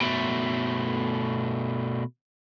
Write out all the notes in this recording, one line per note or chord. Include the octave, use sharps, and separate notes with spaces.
B2 A3